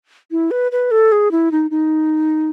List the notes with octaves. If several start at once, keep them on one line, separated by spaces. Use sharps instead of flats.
E4
B4
B4
A4
G#4
E4
D#4
D#4